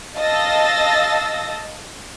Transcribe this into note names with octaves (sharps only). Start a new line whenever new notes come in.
D#5 F5 A5 E6 A6 A#6